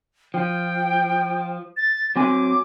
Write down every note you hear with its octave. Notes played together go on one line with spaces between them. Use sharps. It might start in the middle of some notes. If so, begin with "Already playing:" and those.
F3 G5
A6
F#3 C4 G#5 D6